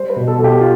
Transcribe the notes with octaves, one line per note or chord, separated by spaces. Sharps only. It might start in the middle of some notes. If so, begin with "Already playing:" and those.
Already playing: G3 C5
B4
B2
A4
B2
G4
F4